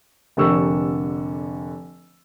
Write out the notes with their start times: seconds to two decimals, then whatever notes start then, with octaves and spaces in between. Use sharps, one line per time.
0.37 F1 D3 G4 A#4 C#6 E6